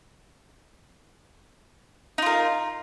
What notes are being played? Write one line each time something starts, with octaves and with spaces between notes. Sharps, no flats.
D#4 F4 A#4